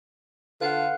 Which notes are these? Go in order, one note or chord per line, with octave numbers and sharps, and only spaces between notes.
D3 F4 B4 F5 F#5